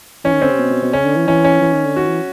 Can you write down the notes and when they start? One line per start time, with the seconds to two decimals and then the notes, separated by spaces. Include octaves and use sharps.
0.24 E3 C#4
0.33 D#3
0.42 D3 C4
0.50 C3
0.59 B2
0.70 B2
0.82 B2
0.93 C#3 C#4
1.05 D3
1.16 E3
1.27 E3 C#4
1.44 C#4
1.61 E3
1.73 D#3
1.85 D3
1.96 D#3 F#4
2.07 E3